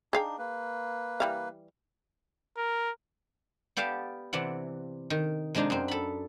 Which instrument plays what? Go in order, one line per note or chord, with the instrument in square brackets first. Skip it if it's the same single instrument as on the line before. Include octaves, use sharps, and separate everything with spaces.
[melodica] D4 D#4 [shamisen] G#4 F5 G5
[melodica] A#3 B4
[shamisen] E3 G3 F5
[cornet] A#4
[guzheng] B3 G4 D5 F5 A5
C3 E3 D5 F#5
D#3
C3 G#3 D4 D#4 F4
F#2 C4
A4 B5